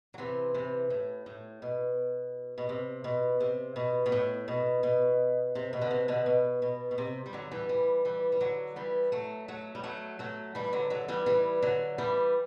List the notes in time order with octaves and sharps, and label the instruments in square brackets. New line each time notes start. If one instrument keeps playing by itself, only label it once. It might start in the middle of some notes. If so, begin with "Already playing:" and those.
[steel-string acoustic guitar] F#3
C3 E3
C3 E3
A2
A2
B2
B2
C3
B2
C3
B2
B2
A2
B2
B2
C3
B2
D3
C3
B2 D3
B2
B2
B2
C3
G3
D3 F#3
E3 G3
E3 G3
E3 G3
G3
D3 F#3
E3 G3
F#3 A3
F#3 A3
G3
F#3 A3
F#3 A3
E3 G3
D3 F#3
D3 F#3
E3 G3
E3 G3
D3 F#3
E3 G3